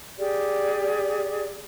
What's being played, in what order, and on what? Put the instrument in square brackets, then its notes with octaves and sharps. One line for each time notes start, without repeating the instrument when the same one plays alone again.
[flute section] G4 G#4 D5